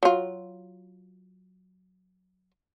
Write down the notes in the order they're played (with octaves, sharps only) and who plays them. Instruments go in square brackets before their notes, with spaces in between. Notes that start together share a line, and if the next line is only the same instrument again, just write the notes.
[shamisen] F#3 F4